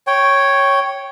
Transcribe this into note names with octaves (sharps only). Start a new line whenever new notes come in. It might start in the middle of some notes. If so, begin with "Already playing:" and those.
C#5 G5